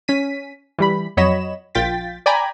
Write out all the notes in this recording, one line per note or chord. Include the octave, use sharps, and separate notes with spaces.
C#4 B6 D#7
E3 G3 B5
F2 F#3 C#5 D#5 B5 E7
A#1 F4 G5 A6 B6
D5 G5 G#5 A#5 B5